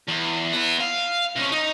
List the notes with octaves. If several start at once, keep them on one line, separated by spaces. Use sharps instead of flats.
E2
B3 E4
F5
C3 C#4
D#4